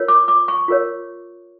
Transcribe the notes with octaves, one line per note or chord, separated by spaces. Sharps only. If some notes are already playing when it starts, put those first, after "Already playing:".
Already playing: F4 A#4 C#5
D6
D6
C#6
F4 A#4 C#5